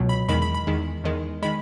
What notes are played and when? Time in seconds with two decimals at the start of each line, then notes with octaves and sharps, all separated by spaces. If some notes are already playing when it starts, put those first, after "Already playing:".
Already playing: C#2 B2 F#3
0.09 B5
0.29 E2 D#3 G#3 B5
0.42 B5
0.54 B5
0.67 E2 D#3 G#3
1.04 E2 D#3 G#3
1.42 D#3 G#3 B5